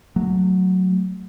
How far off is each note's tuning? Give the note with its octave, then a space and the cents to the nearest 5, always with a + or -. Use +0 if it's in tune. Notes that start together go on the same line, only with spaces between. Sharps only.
F#3 +0 A3 +0